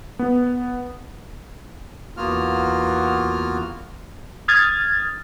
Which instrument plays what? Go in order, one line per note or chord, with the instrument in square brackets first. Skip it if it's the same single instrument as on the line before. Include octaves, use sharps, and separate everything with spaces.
[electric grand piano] B3
[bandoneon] E2 A#3 B3 F4 F#4 F6
[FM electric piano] D#6 F6 G#6 A6